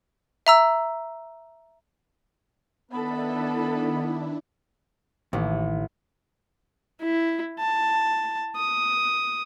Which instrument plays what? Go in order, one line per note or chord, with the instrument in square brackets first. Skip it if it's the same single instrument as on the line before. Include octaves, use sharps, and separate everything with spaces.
[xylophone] E5 A#5 E6
[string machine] D#3 D4 E4 [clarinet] B3 [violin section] A4 B4 B5
[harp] A1 [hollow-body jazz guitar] D#2
[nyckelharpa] E4
A5
D#6